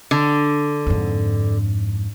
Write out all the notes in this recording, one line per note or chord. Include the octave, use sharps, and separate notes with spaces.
D3
F2 G#2